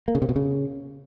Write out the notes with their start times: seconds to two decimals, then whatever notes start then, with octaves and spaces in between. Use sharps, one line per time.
0.08 A#3
0.15 C#3
0.22 C3
0.29 B2
0.36 C#3